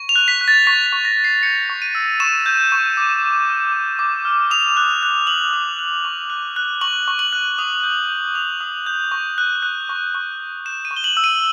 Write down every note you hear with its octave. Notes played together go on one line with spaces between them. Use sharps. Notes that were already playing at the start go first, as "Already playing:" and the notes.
Already playing: C#6
F7
F#6
B6
F#6
A6
C#6 B6
B6
C#6
A#6
F#6
C7
G6 C#7
C#6
D#7
E6
C#6 E7
G6
C#6
D6
F6
F6
D6
D6
F6
D#6 F7
F#6
F#6
D#6 F#7
D#6
F#6
C#6
F#6
F#6
C#6 F#7
C#6
F#7
F#6
D#6
G6
G6
D#6 F7
D#6
G6
C#6
F#6
F#6
C#6
C#6
F#6
G6 E7
D#7
C#6
G7
F#7
E6
D#7